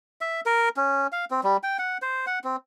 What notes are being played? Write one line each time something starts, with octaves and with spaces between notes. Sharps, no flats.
E5
A#4
C#4
F5
C4
G3
G5
F#5
C5
F#5
C4